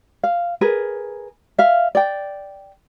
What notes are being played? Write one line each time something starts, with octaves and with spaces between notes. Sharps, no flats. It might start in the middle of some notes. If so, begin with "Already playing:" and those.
F5
G#4 A#4 B4
E5 F5
D5 G5